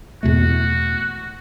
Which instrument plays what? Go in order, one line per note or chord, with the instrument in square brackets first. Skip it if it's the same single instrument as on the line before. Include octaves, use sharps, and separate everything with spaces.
[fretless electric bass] E2 B2 A3 [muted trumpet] F#4